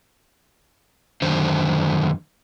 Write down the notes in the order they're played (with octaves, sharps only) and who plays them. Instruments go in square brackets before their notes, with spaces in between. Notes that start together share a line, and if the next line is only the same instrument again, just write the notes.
[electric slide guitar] F#2 D3 D#3 C5